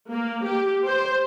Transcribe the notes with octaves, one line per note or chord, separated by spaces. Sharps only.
A#3
G4
C5